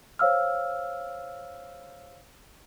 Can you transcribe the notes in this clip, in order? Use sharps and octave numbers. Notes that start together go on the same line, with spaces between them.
C5 C#5 F5 E6 F6